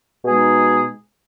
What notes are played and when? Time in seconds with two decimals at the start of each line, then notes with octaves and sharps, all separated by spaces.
0.25 B2 G#3 D#4 G#4